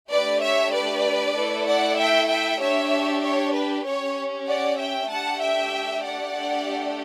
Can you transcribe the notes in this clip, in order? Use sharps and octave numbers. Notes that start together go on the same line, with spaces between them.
A3 D4 G4 B4 D5
C#5 E5
B4 D5
A3 E4 A4
D5 F#5
E5 G5
E5 G5
D4 G4 C#5 E5
C#5
B4
C#4 G4 C#5
D5 F#5
E5 G5
A3 D4 G4 F#5 A5
E5 G5
D5 F#5
A3 D4 G4